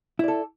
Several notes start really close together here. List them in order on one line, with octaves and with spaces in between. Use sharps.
E4 D5 A4